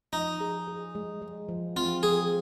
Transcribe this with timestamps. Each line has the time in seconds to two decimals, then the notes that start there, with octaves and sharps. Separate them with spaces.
0.13 F3 D#4
0.41 G#4
0.67 G#4
0.95 G#3
1.22 G#3
1.49 F3
1.76 C4 F4
2.03 F3 G#4